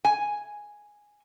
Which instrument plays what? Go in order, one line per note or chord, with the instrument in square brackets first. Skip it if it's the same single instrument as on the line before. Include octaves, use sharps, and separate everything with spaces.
[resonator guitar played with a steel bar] G#5